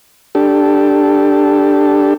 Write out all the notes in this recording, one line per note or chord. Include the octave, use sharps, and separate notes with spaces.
D4 G4 A4